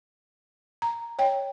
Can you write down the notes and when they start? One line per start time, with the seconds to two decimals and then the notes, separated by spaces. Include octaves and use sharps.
0.82 A#5
1.19 C#5 D#5 G5